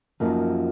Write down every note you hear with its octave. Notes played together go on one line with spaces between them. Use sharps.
F#2 F3 A#3 D#4